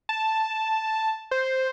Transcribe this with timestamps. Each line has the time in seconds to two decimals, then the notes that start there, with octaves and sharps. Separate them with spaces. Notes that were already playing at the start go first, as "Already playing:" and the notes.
0.09 A5
1.31 C5